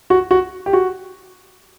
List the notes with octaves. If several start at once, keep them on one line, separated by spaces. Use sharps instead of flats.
F#4
F#4
G4
F#4